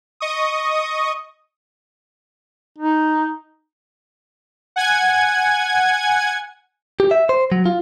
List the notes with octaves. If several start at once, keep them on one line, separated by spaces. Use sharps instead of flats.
D#5 C#6 D#6
D#4
F#5 G#5 G#6
G4
E5
C5
F#3
F4